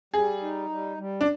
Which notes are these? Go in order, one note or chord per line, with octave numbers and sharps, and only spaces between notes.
G3 G#4
D#4
G3
G3
D4